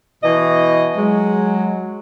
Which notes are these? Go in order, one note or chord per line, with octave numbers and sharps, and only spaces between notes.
B2 E3 D#5
F#3 G#3